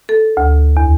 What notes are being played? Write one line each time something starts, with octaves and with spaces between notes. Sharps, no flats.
A4
D2
E2